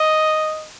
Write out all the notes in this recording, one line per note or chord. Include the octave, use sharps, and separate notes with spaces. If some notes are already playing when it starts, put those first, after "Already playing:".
Already playing: D#5